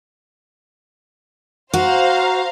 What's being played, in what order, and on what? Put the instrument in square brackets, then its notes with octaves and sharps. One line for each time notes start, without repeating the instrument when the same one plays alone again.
[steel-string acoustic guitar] F#4 [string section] C5 F5 A#5